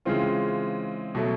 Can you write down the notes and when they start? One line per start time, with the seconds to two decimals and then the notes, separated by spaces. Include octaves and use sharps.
0.05 C#3 E3 G#3 C4 F4
1.15 B2 F#3 A3